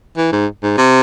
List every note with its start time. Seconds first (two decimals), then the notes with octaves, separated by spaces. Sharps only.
0.18 E3
0.33 G#2
0.63 G#2
0.78 C3